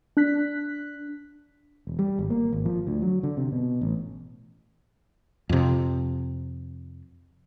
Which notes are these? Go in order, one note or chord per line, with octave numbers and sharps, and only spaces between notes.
D4 F#6 B6
E1
G3
G#1
A#3
G#1
F3
D2
F#3
D3
C3
B2
A1
F2 C3